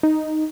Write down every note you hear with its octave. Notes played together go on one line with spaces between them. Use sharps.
D#4